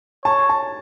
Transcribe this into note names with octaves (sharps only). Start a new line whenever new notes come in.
C#5 A5
A5